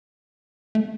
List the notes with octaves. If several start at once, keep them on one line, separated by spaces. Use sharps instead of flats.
A3